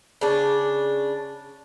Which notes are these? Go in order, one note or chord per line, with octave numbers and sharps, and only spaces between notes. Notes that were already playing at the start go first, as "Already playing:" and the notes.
C#3 D4